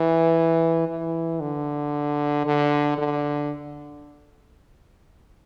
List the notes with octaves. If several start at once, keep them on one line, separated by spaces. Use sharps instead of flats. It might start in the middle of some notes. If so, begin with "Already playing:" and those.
Already playing: E3
E3
D3
D3
D3